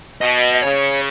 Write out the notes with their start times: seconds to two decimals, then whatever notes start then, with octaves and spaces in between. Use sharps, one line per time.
0.21 B2 D#5
0.62 C#3 C#5